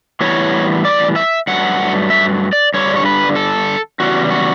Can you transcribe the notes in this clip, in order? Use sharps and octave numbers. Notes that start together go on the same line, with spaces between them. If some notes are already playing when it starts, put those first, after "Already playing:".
A2 E3 G3 B3 C#5
D5
E5
G2 F#3 A3 F#5
E5
D5
G2 D3 G3 C#5
C#5
B4
A4
E2 C#3 G3 F#4
F#4